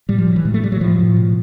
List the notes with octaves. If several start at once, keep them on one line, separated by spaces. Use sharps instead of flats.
A2 G3
F3
A2 F#3
E3
A2 G#3
A3
A2 G3
F#3
A2 F3
A2
B2